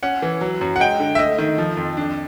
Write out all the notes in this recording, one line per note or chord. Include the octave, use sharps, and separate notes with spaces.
C#4 F#5
E3
F#3
F#2
F#5
G#3 G5
D3
E5
A3 D#5
D#3 D#5
F3
F2
D4